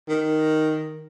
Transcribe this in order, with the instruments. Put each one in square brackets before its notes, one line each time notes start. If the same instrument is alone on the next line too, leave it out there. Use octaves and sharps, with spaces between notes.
[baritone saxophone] D#3